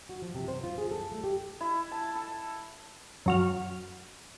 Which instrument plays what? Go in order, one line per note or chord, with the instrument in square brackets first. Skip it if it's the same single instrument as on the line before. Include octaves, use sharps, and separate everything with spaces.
[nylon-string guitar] F#4
F3
C3
C5
F4
G#4
A4
A3
G4
[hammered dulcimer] E4
A5
A4
[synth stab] F#2 F#4 F6